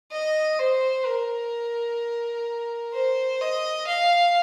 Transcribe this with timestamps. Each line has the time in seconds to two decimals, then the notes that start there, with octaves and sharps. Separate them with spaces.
0.12 D#5
0.59 C5
1.06 A#4
2.94 C5
3.41 D#5
3.87 F5